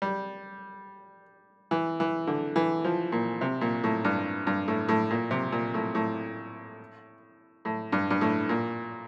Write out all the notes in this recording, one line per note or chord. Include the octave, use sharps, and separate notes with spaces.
G3
E3
E3
D3
E3
F3
A#2
C3
A#2
A2
G2
G2
A2
A2
A#2
C3
A#2
A2
A2
A2
G2
G2
A2
A#2